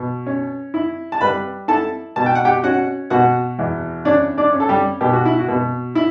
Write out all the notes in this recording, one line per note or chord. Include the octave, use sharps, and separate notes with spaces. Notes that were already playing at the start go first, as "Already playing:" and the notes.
Already playing: B2
C#4
E4
A5
G3 B4 B5
E4 A4 A5
B2 A5
G5
F#5
G4 G5
C#4 F#4 F#5
B2 F#4 F#5
E2
C#4 D4 D5
D4 D5
C#4
A4
G3 G4
B2 G4
F#4
E4
F#4
B2
E4